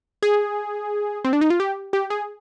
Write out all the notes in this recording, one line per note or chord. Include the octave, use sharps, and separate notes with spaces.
G#4
C4
D4
D#4
F4
G4
G4
G#4